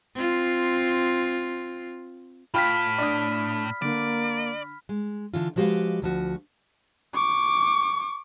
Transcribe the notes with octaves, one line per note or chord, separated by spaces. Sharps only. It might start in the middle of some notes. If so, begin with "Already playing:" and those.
C4 F4
A2 F4 G5 B5 F6 B6
D4 D5 D#6
D3 A#3 D5
G#3
D3 E3 F4
F3 G#3 F#4 G4 B4 F5
D2 F3 F#4
C#6 D6